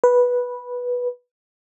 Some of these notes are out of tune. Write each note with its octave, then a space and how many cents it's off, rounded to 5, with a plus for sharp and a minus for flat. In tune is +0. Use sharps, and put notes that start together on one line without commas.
B4 -10